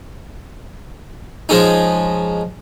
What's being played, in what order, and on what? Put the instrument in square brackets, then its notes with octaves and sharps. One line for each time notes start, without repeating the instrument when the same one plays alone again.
[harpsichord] F3 G#3 C#4 D#4